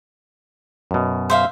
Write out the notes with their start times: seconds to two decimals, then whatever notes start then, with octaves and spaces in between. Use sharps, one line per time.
0.91 F#2 B2
1.30 C5 E5 F5